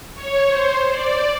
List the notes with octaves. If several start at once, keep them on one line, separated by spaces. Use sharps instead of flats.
C#5
C5
D5